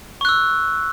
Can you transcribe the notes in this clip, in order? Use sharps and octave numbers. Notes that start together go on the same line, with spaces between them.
C#6 E6 F#6